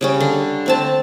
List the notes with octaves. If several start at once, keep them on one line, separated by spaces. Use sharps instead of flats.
C#3 G3 C#4
D3
A3 C4 A5